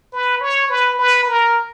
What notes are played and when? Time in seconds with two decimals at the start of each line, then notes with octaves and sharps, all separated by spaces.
0.12 B4
0.41 C#5
0.70 B4
0.99 B4
1.28 A#4